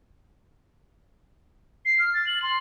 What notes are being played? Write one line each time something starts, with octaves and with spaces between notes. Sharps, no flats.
C7
F6
A6
F#7
C6